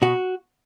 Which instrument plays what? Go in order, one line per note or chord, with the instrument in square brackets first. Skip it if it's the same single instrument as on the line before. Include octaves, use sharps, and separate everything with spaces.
[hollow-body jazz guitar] B2 F#4